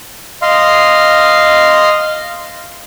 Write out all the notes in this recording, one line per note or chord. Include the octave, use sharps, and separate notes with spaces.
D#5 F5 C6